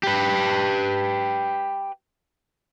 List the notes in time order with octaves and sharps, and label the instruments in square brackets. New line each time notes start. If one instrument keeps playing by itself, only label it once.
[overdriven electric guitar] G4 B4